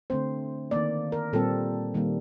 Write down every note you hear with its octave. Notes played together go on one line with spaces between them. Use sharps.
D3 A3 C4 C5
D#3 A#3 D5
A#4
A#2 G3 C4 A4
D#3 G3 A#3